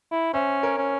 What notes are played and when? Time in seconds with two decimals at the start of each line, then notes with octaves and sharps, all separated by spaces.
0.12 E4
0.33 C#4 C5 E5
0.63 A#4 C#5
0.78 C#4